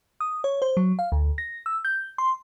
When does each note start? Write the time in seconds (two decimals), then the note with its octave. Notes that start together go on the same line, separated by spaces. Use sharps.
0.20 D#6
0.44 C#5
0.62 C5
0.77 F#3
0.99 F5
1.12 D2
1.38 A#6
1.66 E6
1.85 G6
2.18 C6